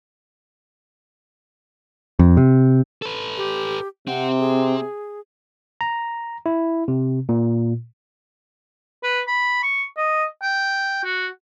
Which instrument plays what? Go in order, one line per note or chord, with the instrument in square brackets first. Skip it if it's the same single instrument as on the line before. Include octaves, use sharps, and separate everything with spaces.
[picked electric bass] F2
C3
[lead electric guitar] A4 B4
[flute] G4
[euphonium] C3 [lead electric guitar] C4 [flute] F#5
[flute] G#4
[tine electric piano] A#5
E4
C3
A#2
[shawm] B4
B5
C#6
D#5
G5
F#4